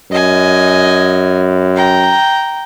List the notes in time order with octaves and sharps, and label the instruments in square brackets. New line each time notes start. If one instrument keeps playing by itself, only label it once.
[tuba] F#2 [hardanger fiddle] D#5 G#5
[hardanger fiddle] G5 A#5